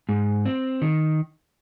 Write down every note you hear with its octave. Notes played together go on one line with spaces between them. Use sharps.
G#2
C4
D#3